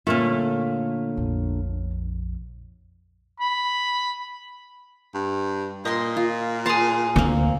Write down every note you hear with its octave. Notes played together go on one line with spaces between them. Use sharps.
A#2 D3 A3 A#3 C#4 F4
A#1 F2
B5
G2
A#2 D#5 C6
F4
G#4 A5 A#5 C6
D2 A#3 C4